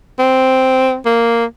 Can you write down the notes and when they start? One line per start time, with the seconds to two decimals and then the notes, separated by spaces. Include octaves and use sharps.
0.19 C4
1.05 A#3